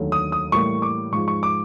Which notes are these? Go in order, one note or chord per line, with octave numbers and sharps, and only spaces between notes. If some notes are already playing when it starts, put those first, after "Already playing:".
Already playing: D#2 D3 F#3 A3
D#6
D#6
A2 E3 G3 A#3 C#6
D6
G#2 F3 G#3 C#6
C#6
D6